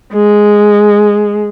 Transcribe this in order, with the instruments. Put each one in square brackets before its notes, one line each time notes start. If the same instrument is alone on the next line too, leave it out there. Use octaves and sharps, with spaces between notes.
[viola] G#3